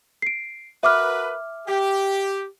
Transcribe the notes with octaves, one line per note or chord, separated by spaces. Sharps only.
C7 D7
F#4 A#4 B4 E5 D6 F6
G4